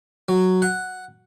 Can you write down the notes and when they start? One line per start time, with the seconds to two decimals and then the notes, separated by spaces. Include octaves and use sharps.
0.29 F#3
0.62 F#5